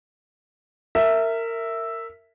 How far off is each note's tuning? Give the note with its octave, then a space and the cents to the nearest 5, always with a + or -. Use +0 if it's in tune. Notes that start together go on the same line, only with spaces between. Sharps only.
A#4 -25 E5 +0